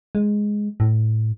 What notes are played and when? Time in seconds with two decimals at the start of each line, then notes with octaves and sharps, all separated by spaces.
0.15 G#3
0.80 A2